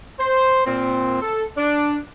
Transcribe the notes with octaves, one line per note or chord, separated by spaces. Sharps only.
C5
A#2 C4
A4
D4